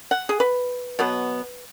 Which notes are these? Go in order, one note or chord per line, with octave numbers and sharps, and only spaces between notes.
F#5
G#4
B4
B2 F#3 B3